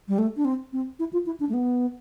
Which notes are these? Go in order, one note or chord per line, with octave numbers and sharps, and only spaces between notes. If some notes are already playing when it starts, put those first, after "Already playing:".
G3
A3
D4
C4
C4
E4
F4
E4
D4
A3
B3